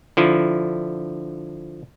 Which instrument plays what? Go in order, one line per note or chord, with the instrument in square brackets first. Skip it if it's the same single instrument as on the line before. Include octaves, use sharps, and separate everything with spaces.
[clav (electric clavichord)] D3 F3 E4